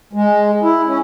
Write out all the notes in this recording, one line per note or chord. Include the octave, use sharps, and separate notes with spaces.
G#3
E4
C#4